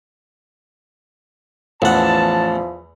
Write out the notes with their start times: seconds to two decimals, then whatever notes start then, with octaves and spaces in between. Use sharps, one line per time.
1.82 A1 E2 F3 F#5 A5